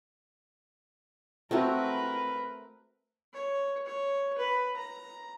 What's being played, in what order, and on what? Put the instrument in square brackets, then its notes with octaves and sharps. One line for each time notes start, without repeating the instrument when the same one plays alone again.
[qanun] A3 C4 F#4 [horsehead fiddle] A#4 B4
[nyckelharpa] C#5
C#5
B4
A#5